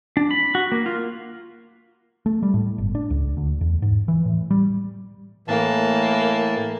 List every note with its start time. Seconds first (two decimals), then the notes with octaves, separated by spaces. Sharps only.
0.17 D4
0.31 B5
0.55 F#4
0.72 A#3
0.86 F4
2.26 A3
2.43 G3
2.54 A2
2.78 G1
2.95 D4
3.10 C#2
3.37 D2
3.61 E2
3.82 G#2
4.08 E3
4.25 A2
4.51 G3
5.48 A2 E3 A#3 A5